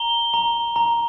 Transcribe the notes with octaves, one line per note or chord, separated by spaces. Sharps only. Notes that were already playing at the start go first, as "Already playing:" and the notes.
Already playing: A#5 G7
A#5
A#5